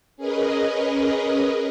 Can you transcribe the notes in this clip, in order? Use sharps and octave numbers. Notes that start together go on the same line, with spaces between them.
C#4 G#4 A#4 B4 D#5